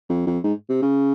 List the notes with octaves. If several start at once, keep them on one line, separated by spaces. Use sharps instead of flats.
F2
F2
G#2
C3
C#3